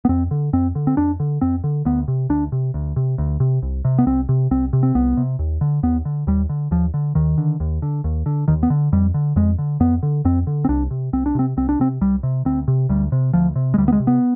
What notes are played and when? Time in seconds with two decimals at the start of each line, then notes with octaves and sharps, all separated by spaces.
0.05 B3
0.09 F2 C4
0.31 D3
0.53 F2 C4
0.75 D3
0.87 C4
0.97 F2 D4
1.20 D3
1.41 F2 C4
1.64 D3
1.85 D2 B3
2.08 C3
2.29 D2 D4
2.52 C3
2.74 D2
2.96 C3
3.18 D2
3.40 C3
3.62 C2
3.85 C3
3.98 B3
4.07 C2 C4
4.29 C3
4.51 C2 C4
4.73 C3
4.83 C4
4.95 C2 B3
5.17 C3
5.39 D#2
5.61 D3
5.83 D#2 B3
6.05 D3
6.27 D#2 G3
6.49 D3
6.71 D#2 F3
6.94 D3
7.15 D#2 D#3
7.38 D3
7.60 D#2
7.82 D3
8.04 D#2
8.26 D3
8.48 D#2 D#3
8.63 B3
8.70 D3
8.92 F2 G3
9.14 D3
9.36 F2 G#3
9.58 D3
9.80 F2 B3
10.03 D3
10.25 F2 C4
10.47 D3
10.65 C4
10.69 C2 D4
10.91 C3
11.13 C2 C4
11.26 D4
11.35 C3 C4
11.57 C2 C4
11.69 D4
11.79 C3 C4
12.01 C2 G3
12.23 C3
12.45 D2 C4
12.68 C3
12.89 D2 G3
13.12 C3
13.33 D2 F3
13.56 C3
13.74 G#3
13.78 D2 G3
13.88 B3
13.92 G#3
14.00 C3
14.07 B3